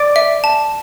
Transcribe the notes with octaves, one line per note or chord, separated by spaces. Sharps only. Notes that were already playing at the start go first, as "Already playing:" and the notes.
Already playing: D5
E5
A5